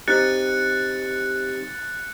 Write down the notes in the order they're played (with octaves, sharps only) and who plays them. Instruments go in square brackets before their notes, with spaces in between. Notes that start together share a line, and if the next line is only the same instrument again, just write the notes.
[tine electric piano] C4 D#4 G4 [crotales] F#6 A6 C#7